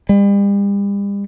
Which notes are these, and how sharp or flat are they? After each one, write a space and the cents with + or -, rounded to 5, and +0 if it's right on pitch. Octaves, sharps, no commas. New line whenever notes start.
G3 +40